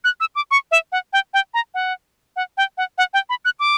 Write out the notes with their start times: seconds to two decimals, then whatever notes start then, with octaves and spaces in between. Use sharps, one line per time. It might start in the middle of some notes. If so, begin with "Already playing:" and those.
0.04 F#6
0.20 E6
0.35 D6
0.51 C#6
0.71 E5
0.92 F#5
1.13 G5
1.34 G5
1.54 A#5
1.74 F#5
2.36 F#5
2.57 G5
2.78 F#5
2.98 F#5
3.14 G5
3.29 B5
3.45 F#6
3.60 D6